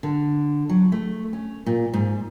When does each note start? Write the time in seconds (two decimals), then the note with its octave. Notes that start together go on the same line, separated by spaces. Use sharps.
0.03 D3
0.69 F#3
0.92 A3
1.33 C#4
1.66 A#2
1.93 G#2